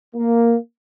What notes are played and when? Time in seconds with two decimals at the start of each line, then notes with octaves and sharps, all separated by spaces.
0.15 A#3